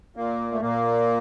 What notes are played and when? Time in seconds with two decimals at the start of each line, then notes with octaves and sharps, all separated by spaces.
0.16 A#2 A#3
0.52 A3
0.61 A#2 A#3